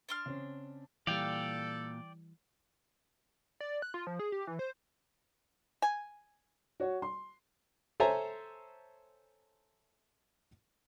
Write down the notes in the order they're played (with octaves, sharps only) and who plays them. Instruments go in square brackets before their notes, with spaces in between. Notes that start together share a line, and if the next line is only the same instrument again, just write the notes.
[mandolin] D4 C6 F6
[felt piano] C#3 C4 C#4
[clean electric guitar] A#2 F5 [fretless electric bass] E3 G3 [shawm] A4 [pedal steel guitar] D5 G5
[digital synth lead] D5
F#6
F4
F3
G#4
G4
E3
C5
[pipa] G#5
[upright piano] F#4 C#5
C6
[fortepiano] A4 C5 C#5 E5 G#5 A#5